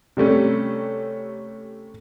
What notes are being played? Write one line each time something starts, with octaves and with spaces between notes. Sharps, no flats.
C3 G3 A3 C#4